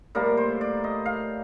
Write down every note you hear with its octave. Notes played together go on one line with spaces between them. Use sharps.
A2 G3 A#3 A#4
C5
D5
D#5
F5